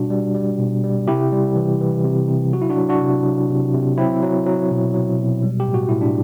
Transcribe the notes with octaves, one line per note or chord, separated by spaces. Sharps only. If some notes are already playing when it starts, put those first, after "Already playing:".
Already playing: B2 G3 D4 F#4
G3
G3
B2
G3
C3 E4 G4
G3
E3
E3
C3
C3
F#3 F#4
E4
D4 F#4
F#3
D4 F#4
C3
F#3
C3
C3
F#3 C4 E4
F#3
F#3
B2
F#3
B2
G3
G4
A2
F#4
A2 E4
D4